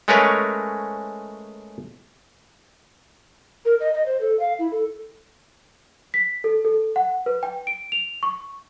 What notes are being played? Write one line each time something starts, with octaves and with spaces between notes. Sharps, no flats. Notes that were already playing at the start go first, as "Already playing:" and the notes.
G#3 A3 C#4 A#4 B4 C#5
A#4
D#5
D#5
C5
A4
F5
E4
A4
B6
A4
A4
F#5
B4
G5
D7
F7
C#6